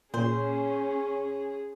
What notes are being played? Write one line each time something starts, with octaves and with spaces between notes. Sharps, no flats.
A#2 C#4 G#4 C5